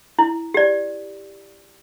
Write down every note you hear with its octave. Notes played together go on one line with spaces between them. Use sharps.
E4
G4 D5